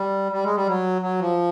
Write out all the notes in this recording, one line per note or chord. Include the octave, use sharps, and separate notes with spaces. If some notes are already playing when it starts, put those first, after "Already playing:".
Already playing: G3
G3
G#3
G3
F#3
F#3
F3